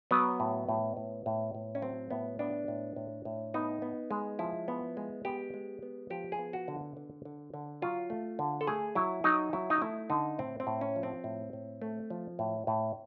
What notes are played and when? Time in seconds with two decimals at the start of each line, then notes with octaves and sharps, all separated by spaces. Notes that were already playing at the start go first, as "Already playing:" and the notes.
0.11 F#3 B3
0.40 A2
0.69 A2
0.97 A2
1.26 A2
1.55 A2
1.75 C#4
1.82 F#3 C4
2.11 A2 B3
2.39 B3 D4
2.68 A2
2.96 A2
3.25 A2
3.54 B3 D#4
3.82 B3
4.11 G#3
4.39 F3 E4
4.68 B3
4.97 G#3
5.25 B3 G4
5.54 G#3
5.82 B3
6.10 F3 G4
6.32 G#4
6.39 B3
6.53 F#4
6.68 D3
6.97 D3
7.25 D3
7.54 D3
7.82 F#3 F4
8.10 A3
8.39 D3
8.61 A4
8.67 A3 G#4
8.95 F#3 E4
9.24 F#3 D#4
9.53 F#3 E4
9.70 D#4
9.82 A3 E4
10.10 D3 D#4
10.38 A2 C4
10.60 C4
10.67 A2
10.81 C#4
10.96 F3
11.03 C4
11.24 A2
11.53 A2
11.82 A3
12.10 F3
12.39 A2
12.67 A2